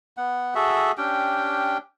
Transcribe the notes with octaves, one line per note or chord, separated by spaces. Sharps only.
B3 F#5
F#4 G#4 A4 E5
C#4 D4 G4 G5